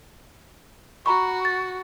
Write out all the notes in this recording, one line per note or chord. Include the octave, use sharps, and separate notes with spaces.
F#4 A#5 B5 C#6
A6